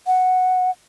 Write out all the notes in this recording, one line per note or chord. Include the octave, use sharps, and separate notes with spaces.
F#5